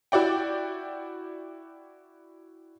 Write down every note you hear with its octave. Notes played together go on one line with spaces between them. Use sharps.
E4 F#4 D5 G5